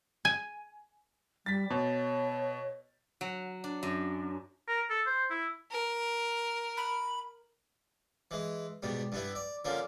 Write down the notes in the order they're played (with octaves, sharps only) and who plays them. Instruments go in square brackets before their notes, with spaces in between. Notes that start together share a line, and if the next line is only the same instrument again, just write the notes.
[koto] G#5
[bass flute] G3 [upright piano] A6 B6
[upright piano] B2 [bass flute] C#5
[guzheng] F#3
D4
F#2
[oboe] A#4
A4
C5
E4
[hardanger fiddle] A#4
[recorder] B5
[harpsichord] E3 G#3
G#2 B2 G3
G2 B3 E4
D5
D3 F3 A#3 C#4